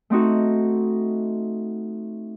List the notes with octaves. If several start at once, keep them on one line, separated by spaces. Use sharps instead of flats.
A3 C4 D#4 F#4 A4